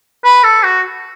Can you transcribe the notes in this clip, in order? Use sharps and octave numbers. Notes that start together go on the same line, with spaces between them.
B4
A4
F#4